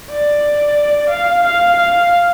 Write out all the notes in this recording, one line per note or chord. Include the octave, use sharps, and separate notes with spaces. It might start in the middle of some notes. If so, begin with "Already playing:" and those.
D5
F5
F5
F5